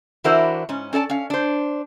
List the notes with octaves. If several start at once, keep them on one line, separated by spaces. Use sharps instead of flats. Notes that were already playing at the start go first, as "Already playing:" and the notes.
E3 D4 E4 F#4 A#4 C5
G#2 C#4
C#4 A4 D5 A5
C#4 F5
D4 C5